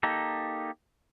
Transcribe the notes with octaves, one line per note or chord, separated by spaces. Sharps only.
A#3 D#4 G4 A4